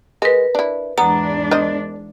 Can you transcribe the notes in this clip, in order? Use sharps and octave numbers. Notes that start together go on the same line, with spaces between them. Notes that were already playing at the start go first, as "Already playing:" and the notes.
G#3 A#4 B4
D4 E4
E2 G#2 B3 D4 A#5
A#4 C5 D#5